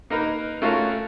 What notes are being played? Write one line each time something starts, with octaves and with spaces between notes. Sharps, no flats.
A#3 D#4 A#4 B4
A3 C#4 F4 F#4 A4 A#4